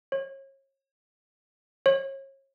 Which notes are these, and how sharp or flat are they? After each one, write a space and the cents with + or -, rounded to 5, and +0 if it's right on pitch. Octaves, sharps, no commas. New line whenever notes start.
C#5 -35
C#5 -35